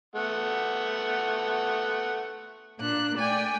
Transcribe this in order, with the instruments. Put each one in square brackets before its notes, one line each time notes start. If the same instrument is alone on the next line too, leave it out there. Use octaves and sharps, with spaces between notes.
[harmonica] A3 B3 F#5
[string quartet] A#2 A#3 D4 F#6
A3 D5 G5 G#5